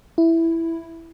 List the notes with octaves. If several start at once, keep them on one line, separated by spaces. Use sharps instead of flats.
E4